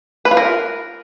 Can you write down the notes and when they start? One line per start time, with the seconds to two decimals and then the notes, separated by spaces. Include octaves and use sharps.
0.25 B4
0.31 F4
0.37 A#4